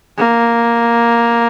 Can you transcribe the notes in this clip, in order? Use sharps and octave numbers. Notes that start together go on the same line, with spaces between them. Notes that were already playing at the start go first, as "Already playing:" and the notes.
A#3